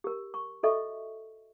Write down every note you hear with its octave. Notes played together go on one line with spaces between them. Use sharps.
G4 A#4
C#6
F#4 A4 D#5 E5 C#6